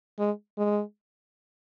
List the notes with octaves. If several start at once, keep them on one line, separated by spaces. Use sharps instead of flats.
G#3
G#3